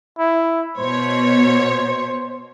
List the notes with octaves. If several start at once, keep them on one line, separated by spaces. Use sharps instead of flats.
E4
B2 C5 C#5